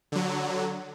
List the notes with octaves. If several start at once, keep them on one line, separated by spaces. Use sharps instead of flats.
D3 F#3